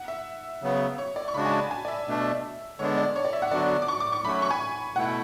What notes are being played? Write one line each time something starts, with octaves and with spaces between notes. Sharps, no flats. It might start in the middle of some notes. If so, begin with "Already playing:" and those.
Already playing: F#5
E5
C#3 F#3 B3
C#5
D5
C#6
C#3 G#3 D4 F#4 B5
G#5
A5
G#5
D5
E5
B2 A3 D4
D3 G#3 B3 D4 C#5
D5
C#5
D5
E5
F#5
D3 F#3 B3 D4 F#4 D5
D6
C#6
D6
C#6
F#3 A3 C#4 F#4 B5
C#6
G#5
B2 A3 E4 F#5